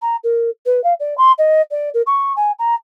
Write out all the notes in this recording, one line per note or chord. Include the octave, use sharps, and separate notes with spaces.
A#5
A#4
B4
F5
D5
C6
D#5
D5
A#4
C#6
G#5
A#5